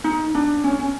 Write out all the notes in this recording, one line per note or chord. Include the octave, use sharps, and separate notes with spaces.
D#4
D4
C#4
C#4